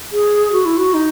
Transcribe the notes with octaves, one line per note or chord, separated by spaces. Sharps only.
G#4
F#4
E4
F#4
D#4